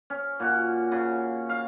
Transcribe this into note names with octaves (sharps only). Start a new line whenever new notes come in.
C#4
A#2 F#4
C#3
F5